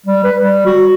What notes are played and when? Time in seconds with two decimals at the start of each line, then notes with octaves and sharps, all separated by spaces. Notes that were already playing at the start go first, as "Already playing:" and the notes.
0.06 G3
0.24 B4
0.39 G3
0.66 F#4